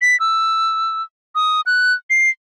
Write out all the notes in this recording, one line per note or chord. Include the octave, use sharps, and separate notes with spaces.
B6
E6
D#6
F#6
C7